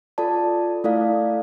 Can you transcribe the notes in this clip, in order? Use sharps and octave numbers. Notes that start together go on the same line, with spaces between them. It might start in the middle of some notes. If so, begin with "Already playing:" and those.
F4 A4 D5 A5
A3 E4 A4 D5 F5